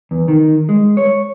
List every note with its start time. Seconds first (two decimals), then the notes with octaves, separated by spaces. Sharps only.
0.11 E2
0.28 D#3
0.69 G#3
0.97 C#5